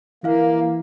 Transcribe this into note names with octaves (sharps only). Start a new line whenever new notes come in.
E3 A#3 E4 E5 F5